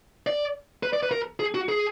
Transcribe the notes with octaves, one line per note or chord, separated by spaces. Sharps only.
D5
B4
D5
B4
A#4
G#4
F#4
G#4